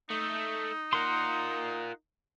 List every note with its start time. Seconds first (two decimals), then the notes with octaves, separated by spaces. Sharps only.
0.10 A3 D#4
0.93 F4 A#4 F#5 C6